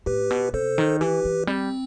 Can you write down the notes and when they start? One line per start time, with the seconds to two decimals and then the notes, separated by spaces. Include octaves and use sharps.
0.06 A2 G4 B4
0.30 B2
0.53 C3 A4 C5
0.78 D#3
1.01 E3 G4 B4
1.25 E3
1.47 G3 C4